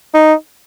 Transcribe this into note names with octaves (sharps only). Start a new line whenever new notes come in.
D#4